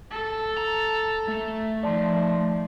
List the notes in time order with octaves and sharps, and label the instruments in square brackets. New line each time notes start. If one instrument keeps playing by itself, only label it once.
[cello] A4
[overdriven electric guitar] A#5
A3
[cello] D#3 F3 [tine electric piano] D5 A5 C6